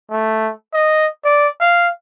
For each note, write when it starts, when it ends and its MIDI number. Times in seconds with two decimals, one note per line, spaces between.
0.10 0.51 57
0.73 1.08 75
1.24 1.48 74
1.60 1.89 77